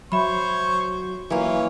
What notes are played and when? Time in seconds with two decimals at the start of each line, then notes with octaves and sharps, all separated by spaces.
0.12 F#3 C5 C#5 E5 B5 C#6
1.30 E3 F#3 A#3 C#4 F4